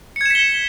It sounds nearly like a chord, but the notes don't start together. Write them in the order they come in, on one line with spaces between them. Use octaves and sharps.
C#7 G#6 E7 B6 G7